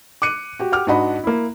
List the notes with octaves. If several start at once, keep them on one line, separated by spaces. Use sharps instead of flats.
D6 F#6 C#7 D#7
F#4 G4
G4 F#5 D6 F6
G#2 D4 F#4 D#5 F#5 B5
A#3 E4